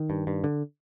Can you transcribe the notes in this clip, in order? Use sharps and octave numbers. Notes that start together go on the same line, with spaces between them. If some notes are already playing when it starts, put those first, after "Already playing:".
Already playing: D#3
G2
G2
D3